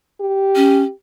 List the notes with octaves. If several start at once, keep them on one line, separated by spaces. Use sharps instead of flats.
G4
C#4